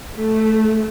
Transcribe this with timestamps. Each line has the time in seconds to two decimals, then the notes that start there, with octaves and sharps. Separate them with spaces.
0.16 A3